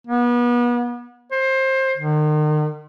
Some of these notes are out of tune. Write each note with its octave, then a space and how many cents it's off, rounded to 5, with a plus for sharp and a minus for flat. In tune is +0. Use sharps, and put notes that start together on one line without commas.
B3 -35
C5 +20
D#3 -40